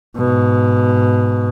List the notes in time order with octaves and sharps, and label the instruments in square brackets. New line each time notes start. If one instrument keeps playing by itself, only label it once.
[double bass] G#2 B2